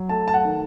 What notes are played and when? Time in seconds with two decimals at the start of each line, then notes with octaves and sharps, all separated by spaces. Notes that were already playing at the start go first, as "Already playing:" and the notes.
Already playing: F#3
0.09 A3 A5
0.28 A5
0.34 F#5
0.45 D#3